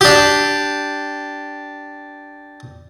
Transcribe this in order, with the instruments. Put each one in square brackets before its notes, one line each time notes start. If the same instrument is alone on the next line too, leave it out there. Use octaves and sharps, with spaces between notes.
[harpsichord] D4 G4